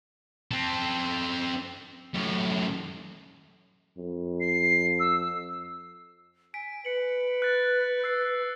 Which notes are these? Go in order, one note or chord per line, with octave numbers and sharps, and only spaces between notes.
C4 A4
F#2 A2
F2
C7
E6
G#5 B6 D7
B4 C#7 F#7
F#6 A6
E6 A6 C7